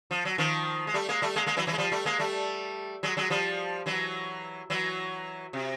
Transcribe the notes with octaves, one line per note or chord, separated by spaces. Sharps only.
F3
F#3
D#3 F3
G#3
G3 A3
G#3 A#3
G3 A3
G#3 A#3
G#3 A#3
E3 F#3
E3 F#3
G#3
F3 G3
G3 A3
G#3 A#3
G3 A3
F#3 G#3
F#3 G#3
F3 G3
E3 F#3
E3 F#3
C3